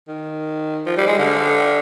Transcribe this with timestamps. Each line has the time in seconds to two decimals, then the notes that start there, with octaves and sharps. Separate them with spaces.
0.08 D#3
0.86 F3
0.97 G3
1.07 G#3
1.19 D3